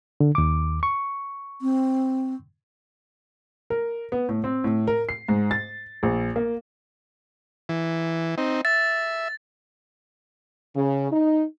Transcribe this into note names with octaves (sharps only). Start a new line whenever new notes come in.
D3
D#2 D6
C#6
C4
A#4
B3
A2
C4
A2
A#4
C7
G#2
A6
A#1
A#3
E3
C4 D#4
E5 A6
C#3
D#4